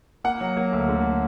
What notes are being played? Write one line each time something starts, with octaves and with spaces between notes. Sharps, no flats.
A#3 F#5
F#3
A#3
D2
D3